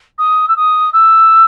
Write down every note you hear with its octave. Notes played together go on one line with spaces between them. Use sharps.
D#6
E6
D#6
E6